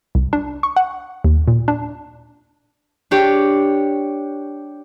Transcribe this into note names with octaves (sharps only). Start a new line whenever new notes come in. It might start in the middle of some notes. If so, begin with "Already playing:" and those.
C2
D4
C#6
F#5
D#2
A#2
D4
D4 G4 C#5